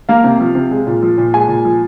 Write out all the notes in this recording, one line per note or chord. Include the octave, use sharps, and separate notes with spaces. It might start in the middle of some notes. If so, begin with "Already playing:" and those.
A#3 F5
C3
F3
C3
G#3
A#2
F3
A#2
G#3 G#5
A#2
F3